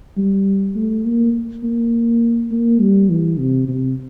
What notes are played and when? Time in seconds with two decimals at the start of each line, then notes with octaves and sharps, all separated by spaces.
0.17 G3
0.76 A3
1.05 A#3
1.64 A#3
2.51 A#3
2.81 G3
3.10 E3
3.39 C3
3.68 C3